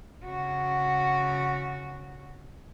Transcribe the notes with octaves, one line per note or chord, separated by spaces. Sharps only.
C#3 F#4